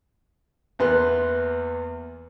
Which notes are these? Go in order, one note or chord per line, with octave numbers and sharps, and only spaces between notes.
E2 A#3 B3 C6 F#6